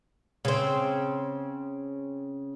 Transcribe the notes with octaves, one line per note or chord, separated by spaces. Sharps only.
C#3 C4